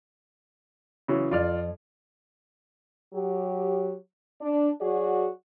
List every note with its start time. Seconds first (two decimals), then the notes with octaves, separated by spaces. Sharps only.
1.08 C#3 E3 F#3
1.31 F2 F4 D5 F6
3.14 F#3 G4
4.40 D4
4.80 F#3 F#4 G#4 D5